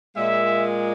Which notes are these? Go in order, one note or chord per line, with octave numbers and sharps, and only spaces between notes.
A#2 G#3 E5